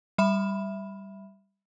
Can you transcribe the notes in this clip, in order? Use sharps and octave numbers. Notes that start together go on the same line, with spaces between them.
G3 E5 B5 E7